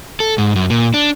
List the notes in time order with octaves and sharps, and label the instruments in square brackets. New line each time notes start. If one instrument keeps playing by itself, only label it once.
[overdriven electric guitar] A4
G#2
F#2
A#2
D4